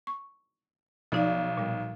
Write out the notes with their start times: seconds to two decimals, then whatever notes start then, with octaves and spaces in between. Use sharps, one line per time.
0.07 C#6
1.12 B1 F3 D#4 D5
1.57 A#2 G3